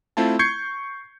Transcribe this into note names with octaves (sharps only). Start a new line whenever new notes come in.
A3 C4 E4 F4 A5
C#6 G6 G#6 C7 C#7